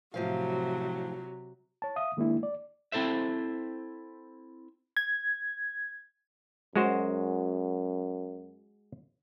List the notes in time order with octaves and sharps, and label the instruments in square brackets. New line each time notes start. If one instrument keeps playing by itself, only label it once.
[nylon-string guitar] A2 F3 F5 [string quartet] C3 F#3
[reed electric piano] C#5 A5
E5 F5 D#6
D#3 G#3 A#3 D4 E4
D5
[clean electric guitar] C4 E4 A4 C5 E5
[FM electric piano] G#6
[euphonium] F#2 [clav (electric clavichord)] G#3 F#4 C5